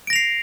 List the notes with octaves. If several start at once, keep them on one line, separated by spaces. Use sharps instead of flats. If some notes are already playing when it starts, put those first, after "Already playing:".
A#6 C7 D7 F7